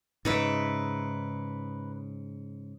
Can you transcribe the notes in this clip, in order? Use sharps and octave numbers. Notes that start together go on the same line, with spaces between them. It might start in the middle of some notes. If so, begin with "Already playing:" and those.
G#2 C#3 D#4 B4 E5